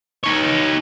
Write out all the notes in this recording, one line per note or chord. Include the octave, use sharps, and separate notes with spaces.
D#4 C#5